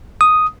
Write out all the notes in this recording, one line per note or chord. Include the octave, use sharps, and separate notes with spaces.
D#6